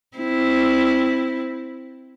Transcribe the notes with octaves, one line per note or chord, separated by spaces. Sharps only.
C4 E4